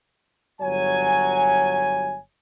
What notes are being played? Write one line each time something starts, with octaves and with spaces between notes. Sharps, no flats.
G1 F#3 C#5 G#5